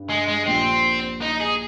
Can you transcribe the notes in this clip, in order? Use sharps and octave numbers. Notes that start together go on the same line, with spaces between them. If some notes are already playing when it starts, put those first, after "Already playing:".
Already playing: G2
G#3
G#3
A#1 A#2 G3 C4
D#4
G#4